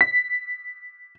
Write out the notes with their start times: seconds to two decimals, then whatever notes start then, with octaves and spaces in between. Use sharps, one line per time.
0.01 B6